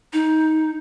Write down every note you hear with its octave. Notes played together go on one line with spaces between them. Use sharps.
D#4